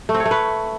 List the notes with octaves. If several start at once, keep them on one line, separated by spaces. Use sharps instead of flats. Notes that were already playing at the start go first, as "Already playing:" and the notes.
A3
C4
C#5
A3
B4